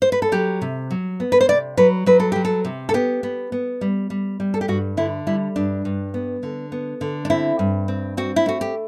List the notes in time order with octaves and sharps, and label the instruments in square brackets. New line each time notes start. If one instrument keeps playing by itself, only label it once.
[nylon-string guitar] C5
B4
A4
F#3 G4
C3
F#3
B3
B4
C5
C3 D5
F#3 B4
F#3 B4
A4
F#3 G4
A4
C3
A4
B3 G4
B3
B3
G3
G3
G3
A4
G4
G2 F#4
D3 E4
G3 E4
G2 D4
G2
B3
D3
B3
D3
D4
C4 E4
G2
C4
C4 F#4
E4
A3 F#4
G4